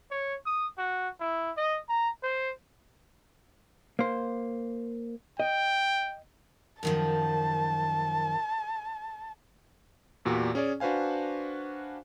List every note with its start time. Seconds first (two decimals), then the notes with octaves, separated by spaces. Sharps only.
0.11 C#5
0.46 D#6
0.78 F#4
1.20 E4
1.57 D#5
1.89 A#5
2.23 C5
3.99 A#3 C5
5.40 D#5 G5
6.83 F#2 D#3 F3 A5
10.25 E2 A#2 F#4 G4
10.55 C#4 G#4 C#5 D5
10.80 D4 F#4 B4 C5 F5 G#5